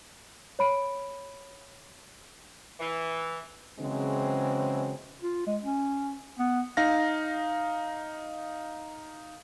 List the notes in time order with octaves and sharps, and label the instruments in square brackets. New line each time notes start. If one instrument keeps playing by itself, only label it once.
[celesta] C#5 B5 D7
[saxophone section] E3
[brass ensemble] C#3 E3 F#3 G#3 C4
[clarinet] F4
G#3
C#4
B3
[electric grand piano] D#4 F5 A#6